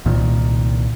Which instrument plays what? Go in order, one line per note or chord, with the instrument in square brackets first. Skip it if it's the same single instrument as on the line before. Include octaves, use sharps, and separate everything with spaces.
[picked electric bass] C2 A#2 D#3